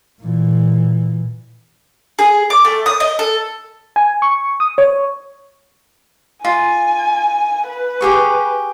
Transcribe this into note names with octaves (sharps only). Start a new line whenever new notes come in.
A#2 E3
G#4
D6
A3
D#6
D#5
A4
G#5
C#6
D#6
C#5
F4 G#5
B4
G4 G#4 C#6